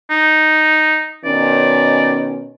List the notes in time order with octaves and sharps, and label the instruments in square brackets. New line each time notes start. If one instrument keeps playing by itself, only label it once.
[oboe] D#4
[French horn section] B2 D#3 C#4 [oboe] D5